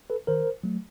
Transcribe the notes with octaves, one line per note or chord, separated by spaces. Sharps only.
A4 B4
D#3 A#4 C5
F#3 A3